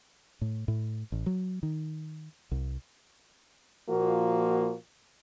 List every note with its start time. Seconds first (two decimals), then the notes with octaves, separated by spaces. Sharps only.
0.41 A2
0.68 A2
1.12 A1
1.26 F#3
1.63 D#3
2.51 C2
3.88 A#2 F3 A#3 F#4